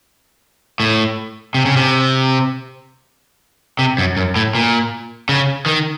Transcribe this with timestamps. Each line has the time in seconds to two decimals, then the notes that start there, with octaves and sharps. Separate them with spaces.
0.80 A2
1.54 C3
1.65 C#3
1.77 C3
3.79 C3
3.98 F#2
4.17 F#2
4.36 A2
4.55 A#2
5.29 C#3
5.66 D#3